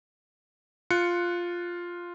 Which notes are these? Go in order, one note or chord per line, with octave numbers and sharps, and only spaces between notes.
F4 F#6 C#7